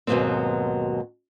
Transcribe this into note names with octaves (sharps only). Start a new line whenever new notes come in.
D#2 G#2 B2 F#3 B3 C4